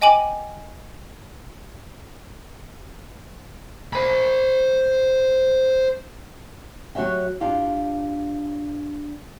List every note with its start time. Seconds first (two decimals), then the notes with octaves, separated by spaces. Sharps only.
0.01 D#5 G5 G#5 D6 F#7
3.93 C5 B5
6.95 F#3 F#4 G4 C#5 E5 G5
7.40 G2 D4 F4 G4